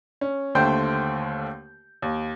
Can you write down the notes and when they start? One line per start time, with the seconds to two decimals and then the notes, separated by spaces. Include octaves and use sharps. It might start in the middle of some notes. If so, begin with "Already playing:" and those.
0.21 C#4
0.55 D#2 D3 A3 C5 G5 G6
2.02 D#2